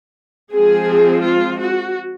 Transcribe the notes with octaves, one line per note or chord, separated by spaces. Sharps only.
F3 G#3 C4 G#4
F4
F#4